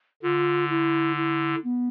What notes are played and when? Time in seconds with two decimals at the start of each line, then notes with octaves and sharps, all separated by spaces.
0.23 D3 F4
0.70 E4
1.17 E4
1.64 B3